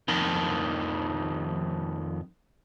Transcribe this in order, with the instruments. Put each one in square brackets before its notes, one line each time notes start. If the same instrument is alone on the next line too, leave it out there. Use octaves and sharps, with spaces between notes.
[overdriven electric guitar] F2 D#3